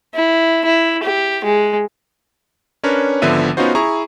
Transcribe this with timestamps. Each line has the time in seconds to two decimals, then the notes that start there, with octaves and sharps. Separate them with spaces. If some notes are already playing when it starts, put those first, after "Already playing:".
0.15 E4
0.65 E4
1.03 G4
1.45 G#3
2.83 C#4 D4 A#4 B4 C#5
3.22 G#1 D3 F3 B3 E5 D#7
3.57 B3 C#4 D#4 F4 F#4 C5
3.75 E4 G#4 A#5 C#6